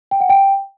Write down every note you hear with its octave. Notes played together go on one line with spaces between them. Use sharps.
G5
F#5
G5